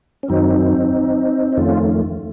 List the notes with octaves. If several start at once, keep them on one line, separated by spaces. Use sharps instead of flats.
C#4
F#2 D#3 F#3 C4 D#4
D#4
F2 D#3 A3 C#4 F4